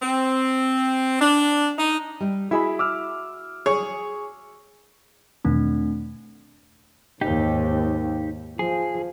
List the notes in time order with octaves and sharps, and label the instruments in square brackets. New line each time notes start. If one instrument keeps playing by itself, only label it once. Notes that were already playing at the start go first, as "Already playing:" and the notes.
[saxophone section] C4
D4
D#4
[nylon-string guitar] G3
[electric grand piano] E4 G#4 B5 [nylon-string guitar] F#4 E5
[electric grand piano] D6 E6 F6
[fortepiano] G#4 C#5
[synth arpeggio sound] E2 B2 D#3 [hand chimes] A3 C4 D4
[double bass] D#2 G#2 [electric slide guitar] D#4 G4
[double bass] F3 [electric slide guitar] G#4